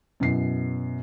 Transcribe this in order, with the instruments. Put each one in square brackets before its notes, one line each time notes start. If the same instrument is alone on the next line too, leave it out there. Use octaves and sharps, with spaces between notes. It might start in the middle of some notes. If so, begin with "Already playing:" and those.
[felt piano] F#2 B2 E4 C7